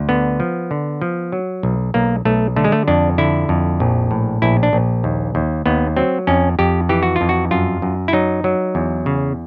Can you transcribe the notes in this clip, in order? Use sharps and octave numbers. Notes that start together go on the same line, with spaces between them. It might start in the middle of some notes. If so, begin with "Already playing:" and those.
Already playing: D2
D3 B3
F3
D3
F3
F#3
B1
B1 A#3
B1 A3
D3 A3
G#3
A3
F2 D4
D3 E4
F2
A#1
A2
A#1 E4
D4
A#1
D#2
D#2
D#2 B3
F#3 C4
F2 C#4
F2 G4
E3 G4
F#4
F4
F2
F#4
F#2 F4
F#2
E4
F#3 D#4
F#3
E2
C#3